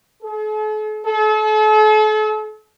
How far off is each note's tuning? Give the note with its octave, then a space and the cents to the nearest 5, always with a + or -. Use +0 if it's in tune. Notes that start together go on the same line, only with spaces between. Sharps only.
A4 -45
A4 -40